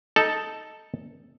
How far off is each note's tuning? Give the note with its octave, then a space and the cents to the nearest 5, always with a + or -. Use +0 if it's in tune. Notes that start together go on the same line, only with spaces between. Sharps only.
D#4 +5 A4 +0